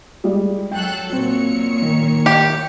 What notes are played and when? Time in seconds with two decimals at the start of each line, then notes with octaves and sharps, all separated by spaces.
0.24 G3 G#3 D5
0.72 F#3 A4 G5 F#6
1.09 A#2 F#3 C4 C#5 C#7
1.82 D#3
2.26 G4